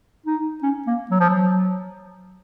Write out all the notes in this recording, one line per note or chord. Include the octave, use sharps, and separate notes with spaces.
D#4
C#4
A#3
F#3
F3
F#3